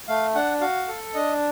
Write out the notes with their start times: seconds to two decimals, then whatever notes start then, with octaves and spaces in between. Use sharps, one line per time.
0.08 A3 F5
0.35 D4 F#5
0.61 F#4 F5
0.88 A4
1.14 D4 D#5